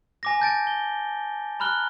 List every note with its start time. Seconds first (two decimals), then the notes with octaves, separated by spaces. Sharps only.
0.23 G#5 D6 A#6
0.40 A5 G6 A6 D7
0.67 G7
1.60 A#5 B5 F6 F#6 G7